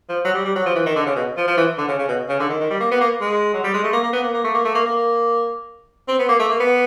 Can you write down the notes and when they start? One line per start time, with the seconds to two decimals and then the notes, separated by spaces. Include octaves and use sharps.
0.09 F3
0.25 F#3
0.34 G3
0.45 G3
0.56 F#3
0.66 F3
0.75 E3
0.86 D#3
0.96 D3
1.06 C#3
1.16 B2
1.37 F3
1.47 F3
1.57 E3
1.78 D3
1.88 C#3
1.99 C#3
2.08 B2
2.29 C#3
2.40 D3
2.49 D#3
2.60 D#3
2.70 G3
2.80 A#3
2.91 B3
3.01 A#3
3.21 G#3
3.54 F#3
3.64 G3
3.73 G#3
3.84 A3
3.93 A#3
4.03 A#3
4.13 B3
4.23 A#3
4.34 A#3
4.44 A3
4.54 A#3
4.65 A3
4.75 A#3
4.86 A#3
6.08 C4
6.19 B3
6.29 A#3
6.39 A3
6.49 A#3
6.60 B3